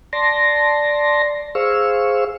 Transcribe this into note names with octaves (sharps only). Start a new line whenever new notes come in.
D5 A5 C6 A#6
G#4 C5 F5 C#6 E6